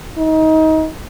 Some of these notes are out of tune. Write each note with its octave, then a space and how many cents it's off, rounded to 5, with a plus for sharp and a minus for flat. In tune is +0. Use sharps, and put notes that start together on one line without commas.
D#4 +25